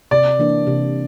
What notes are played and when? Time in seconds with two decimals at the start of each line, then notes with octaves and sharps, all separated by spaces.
0.11 C3 D5
0.39 E3 A#3 D4
0.67 C3